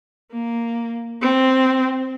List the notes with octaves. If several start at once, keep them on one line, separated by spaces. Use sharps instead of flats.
A#3
C4